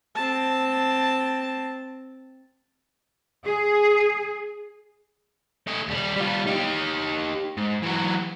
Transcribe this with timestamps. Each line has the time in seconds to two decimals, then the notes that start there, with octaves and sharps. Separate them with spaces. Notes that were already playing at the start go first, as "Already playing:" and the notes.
0.15 C4 A5
3.44 G#4
5.68 A3 D#5
5.88 D#2 G3
6.16 G3 F4
6.47 D#4 G4
7.57 G#2
7.83 E3 F#3